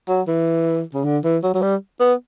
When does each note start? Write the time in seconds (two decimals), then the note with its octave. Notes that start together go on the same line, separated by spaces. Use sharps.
0.08 F#3
0.28 E3
0.94 C#3
1.05 D3
1.24 E3
1.43 F#3
1.54 F#3
1.62 G3
2.00 B3